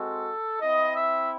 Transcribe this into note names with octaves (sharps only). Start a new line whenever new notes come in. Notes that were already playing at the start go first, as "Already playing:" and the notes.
Already playing: G#3 C4 F#4 A4
C4 E4 D#5
E5